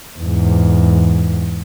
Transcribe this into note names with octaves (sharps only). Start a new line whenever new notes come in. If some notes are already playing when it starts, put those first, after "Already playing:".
E2 G#2